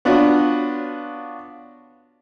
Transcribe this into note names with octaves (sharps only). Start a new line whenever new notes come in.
B3 D4 F4 F#4 C#5